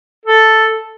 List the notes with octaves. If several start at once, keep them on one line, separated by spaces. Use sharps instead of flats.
A4